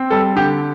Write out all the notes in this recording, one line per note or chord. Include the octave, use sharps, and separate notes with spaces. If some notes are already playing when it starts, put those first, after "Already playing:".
Already playing: C4
G3 A4
D3 G4